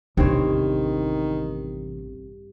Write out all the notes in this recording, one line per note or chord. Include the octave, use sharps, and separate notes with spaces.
A1 E2 G2 C3 D#3 C4 C#5